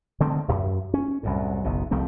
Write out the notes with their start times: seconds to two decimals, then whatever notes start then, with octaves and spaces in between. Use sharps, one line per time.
0.20 D3 D#3 A3 C4
0.48 D1 F#2
0.94 C#4
1.23 C2 F#2 A2
1.64 F#1 B1 B2
1.91 C2 F3 A3 C4